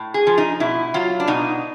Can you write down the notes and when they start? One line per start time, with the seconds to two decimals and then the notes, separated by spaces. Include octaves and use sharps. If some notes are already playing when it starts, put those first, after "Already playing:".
Already playing: A2
0.14 G#4
0.27 F3
0.38 D#4
0.60 B2 E4
0.94 F#3 F4
1.20 D4
1.27 B2 D#4